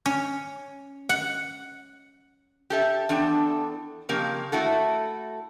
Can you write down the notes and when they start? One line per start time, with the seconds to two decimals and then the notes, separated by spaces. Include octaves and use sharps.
0.06 C#4
1.09 F#5
2.70 G4 A4 E5
3.09 E2 D4 A4 G5
4.09 F2 C#3 A#3 G4
4.52 A3 E4 F#4 A4